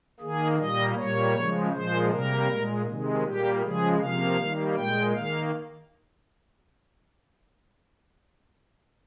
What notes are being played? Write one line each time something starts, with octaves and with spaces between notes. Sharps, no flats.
D#3 A#3 G#4
A#2 G3 A#3 D#5
A#2 G3 A#3 C#5
C#3 F3 G#3
A#2 F3 G#3 C5
C3 G3 A#3 A#4
A#2 G#3
C3 D#3 G#3
A#2 G3 A#3 G4
C#3 F3 G#3 G#4
C3 F3 A#3 F5
D#3 G3 A#3
A#2 G#3 G5
D#3 A#3 F5